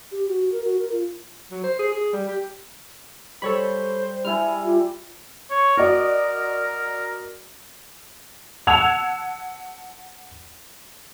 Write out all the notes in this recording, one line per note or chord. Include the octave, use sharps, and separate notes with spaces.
G4
F#4
A#4
F#4
A#4
F4
F#3
C5
G#4
G#4
G3
G4
G3 A4 C5 C#5 B5
G3 E4 G#5 F6
F4 G4
C#5
F#4 A#4 D5 D#5
F#5 A5 E6 G#6 F7